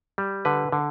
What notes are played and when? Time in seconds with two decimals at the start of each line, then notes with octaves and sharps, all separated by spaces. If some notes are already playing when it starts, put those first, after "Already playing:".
0.18 G3
0.45 D3 B4
0.72 D3